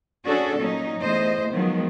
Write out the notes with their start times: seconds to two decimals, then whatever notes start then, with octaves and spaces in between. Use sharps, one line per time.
0.25 C#4 D4 F#4 G#4 A4
0.58 A#2 F#3 C#4 D#4
1.01 E2 A3 C5 D#5
1.52 D#3 F3 F#3 G#3 B3